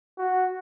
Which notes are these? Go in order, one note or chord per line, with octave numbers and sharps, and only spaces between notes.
F#4